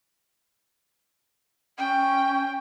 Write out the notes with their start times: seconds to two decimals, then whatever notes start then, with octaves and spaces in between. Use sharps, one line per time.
1.78 C#4 G5